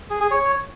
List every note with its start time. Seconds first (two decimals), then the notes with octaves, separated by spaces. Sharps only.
0.10 G#4
0.20 G#4
0.31 C#5